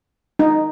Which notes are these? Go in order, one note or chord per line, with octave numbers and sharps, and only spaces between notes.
D#4